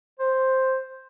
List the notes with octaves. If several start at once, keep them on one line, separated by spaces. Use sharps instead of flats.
C5